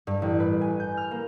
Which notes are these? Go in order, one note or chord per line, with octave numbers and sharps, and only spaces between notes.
G2
A1
B4
G#5
G6
F6
A#3